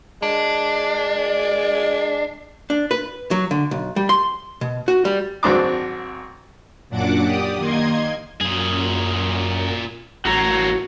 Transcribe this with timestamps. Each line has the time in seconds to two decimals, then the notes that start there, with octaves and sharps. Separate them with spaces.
0.22 G#3 D4
2.70 D4
2.91 B4
3.31 F#3
3.51 D3
3.71 B1
3.96 G3
4.09 C6
4.61 B2
4.88 F#4
5.05 G3
5.43 G#1 F#3 C4 D4 C6 D6
6.89 F#2 A#2 F#3 D4 F#5 D6
7.22 G4 D5 D#6
7.57 D#3 A#3 D#5 C6 G#6
8.41 F#2 A#2 G#4
10.25 A1 A3 A#3 F#4 A#5